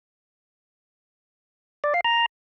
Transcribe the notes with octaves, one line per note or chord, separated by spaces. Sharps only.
D5
F5
A#5